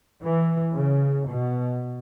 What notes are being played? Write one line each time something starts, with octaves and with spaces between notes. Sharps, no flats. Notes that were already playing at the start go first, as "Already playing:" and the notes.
E3
C#3
B2